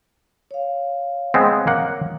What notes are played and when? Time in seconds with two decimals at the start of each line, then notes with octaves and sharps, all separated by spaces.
0.51 C#5 F5
1.34 G#3 B3 C4
1.67 A#3 F#5